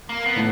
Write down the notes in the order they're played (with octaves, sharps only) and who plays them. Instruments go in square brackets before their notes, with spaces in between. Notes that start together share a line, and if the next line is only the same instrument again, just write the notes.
[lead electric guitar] A#3
B3
[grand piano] A2